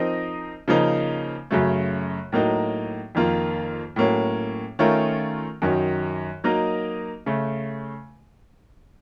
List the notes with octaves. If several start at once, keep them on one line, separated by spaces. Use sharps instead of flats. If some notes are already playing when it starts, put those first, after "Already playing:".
Already playing: F3 C4 D#4 A#4 D#5
C#3 F3 A#3 D#4
F#2 C#3 F#3 A3
A2 F#3 A#3 D#4
F2 D#3 A#3 F4
A2 F#3 A#3 C#4
D#3 A3 C#4 F4 A#4
F#2 D#3 F#3
F#3 A#3 D#4 A#4 D#5
C#3 A3